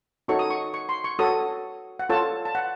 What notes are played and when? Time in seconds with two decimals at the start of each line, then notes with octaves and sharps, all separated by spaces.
0.28 D#4 F#4 A4 C#5 C#6
0.39 D#6
0.50 C#6
0.74 C#6
0.89 C6
1.04 C#6
1.19 F#4 A4 C#5 D#6
1.99 F#5
2.09 F4 A4 C#5 A5
2.45 A5
2.55 F#5